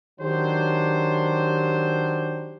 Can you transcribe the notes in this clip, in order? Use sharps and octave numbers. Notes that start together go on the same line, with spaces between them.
D#3 F#3 D4 G4 C5